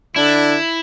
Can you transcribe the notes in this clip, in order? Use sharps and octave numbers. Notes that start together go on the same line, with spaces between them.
D3 D4 E4